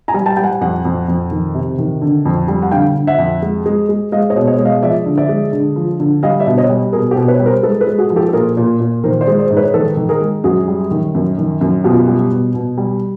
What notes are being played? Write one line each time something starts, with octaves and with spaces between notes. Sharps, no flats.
G#5 A#5
G3
G5 A5
G3 G5
F#5 G#5
F2 F#5 G#5
F2
F2
D#3
C3
D#3
D3
F2
G3
F#5
D3 F5 G5
D3
E5 F#5
F2
G#3
G#3
G#3
G#3 D#5 F5
C#5 D#5
B2
C#5 D#5
G#3
D#5 F5
F3 D5 E5
D3
D5 E5
G#3
D3
F3
D3
G3 D#5 F5
D5 E5
B2
C#5 D#5
G3
B2 G#4 A#4
G4 A4
B2
B4 C#5
G3
A#4 C5
G#3 A4 B4
A4 B4
G#3
F#4 G#4
F3
G4 A4
A4
A#2 G#4 A#4
A#2
A#2
D#3 A#4 C5
C5 D5
G#3
C5 D5
G#2
B4 C#5
D#3 A4 B4
D#3
G#4 A#4
G#3
F#2 F#4 G#4
G3
D#3
F#2
D#3
F#2
B2 F4 G4
G3
B2
B2
G3